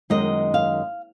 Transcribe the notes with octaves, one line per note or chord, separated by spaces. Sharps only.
F#2 D#3 G#3 B3 D#5
F5